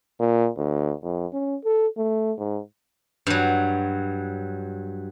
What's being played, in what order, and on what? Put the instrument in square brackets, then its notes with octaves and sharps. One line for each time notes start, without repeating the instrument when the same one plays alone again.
[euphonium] A#2
D2
F2
C#4
A4
A3
G#2
[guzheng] G2 F#3